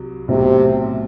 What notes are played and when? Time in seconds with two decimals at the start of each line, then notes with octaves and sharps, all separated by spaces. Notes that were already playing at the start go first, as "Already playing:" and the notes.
Already playing: C2 F#3
0.28 B1 A2 C3 F#3 C4 E4